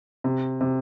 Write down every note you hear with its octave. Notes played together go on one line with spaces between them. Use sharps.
C3
C3